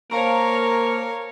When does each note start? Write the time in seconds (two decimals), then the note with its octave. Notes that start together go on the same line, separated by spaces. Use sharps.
0.11 A#3 A#4 C5 C#5 F5 A5 C#6